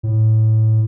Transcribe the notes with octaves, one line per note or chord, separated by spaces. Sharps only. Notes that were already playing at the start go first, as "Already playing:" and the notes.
A2